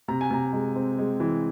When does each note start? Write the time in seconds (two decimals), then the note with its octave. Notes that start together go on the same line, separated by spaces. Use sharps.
0.08 C3 A#5
0.21 G#5
0.30 C3 A#5
0.53 G#3
0.76 C4
0.99 G#3
1.20 E3